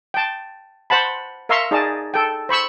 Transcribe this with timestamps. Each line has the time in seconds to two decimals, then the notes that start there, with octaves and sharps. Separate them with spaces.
0.14 G5 A5
0.90 C5 F#5 A5 B5
1.49 A#4 E5 F5 A#5 C6 C#6
1.71 D#4 G#4 D5 D#5 A5
2.14 A4 G5
2.49 C5 B5 C#6 E6